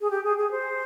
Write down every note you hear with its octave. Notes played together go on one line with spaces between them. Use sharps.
G#4
G4
G#4
G#4
C5